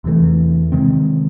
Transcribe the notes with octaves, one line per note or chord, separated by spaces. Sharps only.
E2 C3 E3 A3
C3 D#3 G#3 C4